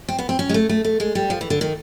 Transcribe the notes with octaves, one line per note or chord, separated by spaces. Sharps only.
C4
B3
C4
C#4
G#3
A3
A3
A3
G#3
G3
F3
E3
D3
D#3